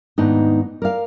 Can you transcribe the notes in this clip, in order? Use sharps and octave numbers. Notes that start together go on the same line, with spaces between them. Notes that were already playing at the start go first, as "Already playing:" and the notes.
D#2 G#2 B3 D4 D#4
A#4 D5 F5